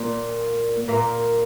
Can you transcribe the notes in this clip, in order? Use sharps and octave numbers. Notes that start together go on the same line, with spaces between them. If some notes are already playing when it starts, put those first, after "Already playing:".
Already playing: A#2 A#3
A#2 A#3